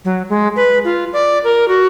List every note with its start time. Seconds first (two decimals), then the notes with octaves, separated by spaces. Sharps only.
0.05 F#3
0.29 G#3
0.56 B4
0.84 F4
1.13 D5
1.44 A#4
1.68 F#4